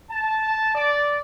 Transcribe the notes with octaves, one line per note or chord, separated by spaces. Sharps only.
A5
D5